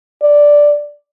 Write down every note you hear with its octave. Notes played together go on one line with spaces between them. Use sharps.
D5